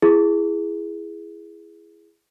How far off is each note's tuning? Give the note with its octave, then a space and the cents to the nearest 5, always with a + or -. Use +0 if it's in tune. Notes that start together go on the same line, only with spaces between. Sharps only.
E4 +20 G#4 +0